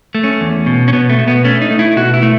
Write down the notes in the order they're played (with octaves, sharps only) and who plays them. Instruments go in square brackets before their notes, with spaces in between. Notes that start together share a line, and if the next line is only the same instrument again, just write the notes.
[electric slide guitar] A3
C#4
E2
B2
C#4
B2 B3
A3
B2
B3
A3 C#4
D#4
A3
E4
B2 F#4
E4
A3